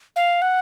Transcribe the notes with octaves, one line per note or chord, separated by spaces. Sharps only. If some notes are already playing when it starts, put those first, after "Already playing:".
F5
F#5